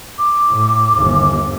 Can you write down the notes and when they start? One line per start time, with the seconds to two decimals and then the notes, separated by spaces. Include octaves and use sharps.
0.18 D6
0.51 A2
0.97 G1 D#2